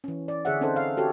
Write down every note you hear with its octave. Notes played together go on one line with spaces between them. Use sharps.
E3 C#4
D5
D3 G#4 C#5 E5 F#5
C4 C#4 D#4 A4 C5
F5
F#4 G4 A4 C#5